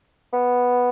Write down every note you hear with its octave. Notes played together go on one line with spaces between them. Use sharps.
B3